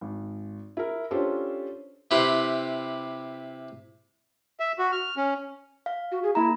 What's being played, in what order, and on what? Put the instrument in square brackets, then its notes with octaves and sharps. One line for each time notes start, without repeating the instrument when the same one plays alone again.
[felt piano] G#1
E4 A#4
C#4 D4 F4 G4 A4 C5
[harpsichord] C3 E4 G4 B4 B5 C6
[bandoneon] E5
F#4
F6
C#4
[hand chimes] F5
[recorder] F#4
G#4
[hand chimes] A#3 A#5 [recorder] E4